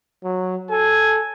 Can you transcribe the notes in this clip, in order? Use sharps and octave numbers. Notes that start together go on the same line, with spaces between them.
F#3
A4 G#5